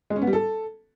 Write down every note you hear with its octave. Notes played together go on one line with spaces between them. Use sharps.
G#3
C#4
B3
G3
A4